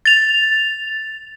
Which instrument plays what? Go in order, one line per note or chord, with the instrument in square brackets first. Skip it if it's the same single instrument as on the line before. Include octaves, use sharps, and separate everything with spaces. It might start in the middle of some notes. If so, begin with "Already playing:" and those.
[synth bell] A6 F7